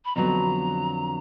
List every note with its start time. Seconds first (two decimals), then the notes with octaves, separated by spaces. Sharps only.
0.05 B5
0.16 F2 D3 F#3 B3 A#5